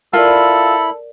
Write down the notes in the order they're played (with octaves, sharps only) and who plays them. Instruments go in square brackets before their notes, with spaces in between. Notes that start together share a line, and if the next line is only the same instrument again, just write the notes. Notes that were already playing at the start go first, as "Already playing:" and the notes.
[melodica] E4 B5 [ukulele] F4 [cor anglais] A4 [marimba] A#4 D5